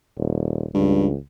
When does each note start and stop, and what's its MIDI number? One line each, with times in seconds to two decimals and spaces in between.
0.18 0.66 27
0.74 1.15 37
0.74 1.08 43